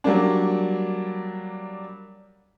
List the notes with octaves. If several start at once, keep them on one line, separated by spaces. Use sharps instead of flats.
F#3 G3 A#3 D4